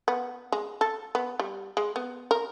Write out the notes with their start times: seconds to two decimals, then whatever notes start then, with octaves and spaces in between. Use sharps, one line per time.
0.08 B3
0.52 G#3
0.81 A4
1.15 B3
1.39 G3
1.77 G#3
1.96 B3
2.31 A#4